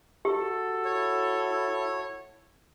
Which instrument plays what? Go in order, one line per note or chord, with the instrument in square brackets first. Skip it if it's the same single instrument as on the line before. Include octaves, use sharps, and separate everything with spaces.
[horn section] F#4 A4 [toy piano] G4
[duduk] E4 [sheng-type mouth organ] C#5